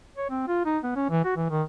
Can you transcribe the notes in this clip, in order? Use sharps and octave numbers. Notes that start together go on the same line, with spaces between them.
C#5
C4
F4
D#4
B3
C#4
E3
F#4
E3
D#3